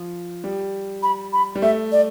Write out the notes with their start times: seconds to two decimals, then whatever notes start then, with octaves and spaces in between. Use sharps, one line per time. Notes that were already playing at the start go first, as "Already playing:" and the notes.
Already playing: F3
0.44 G3
1.03 B5
1.33 B5
1.56 G3
1.62 A3 E5
1.92 D5